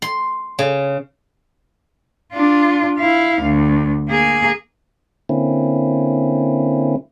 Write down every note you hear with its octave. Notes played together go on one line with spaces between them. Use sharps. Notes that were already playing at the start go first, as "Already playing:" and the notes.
C6
C#3
D4 F4
E4 F5
D2
A#3 G#4
D3 A#3 C4 C#4 E4